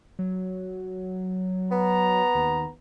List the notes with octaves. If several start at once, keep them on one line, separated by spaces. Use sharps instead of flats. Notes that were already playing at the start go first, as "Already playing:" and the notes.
F#3
B3 A#5
D#2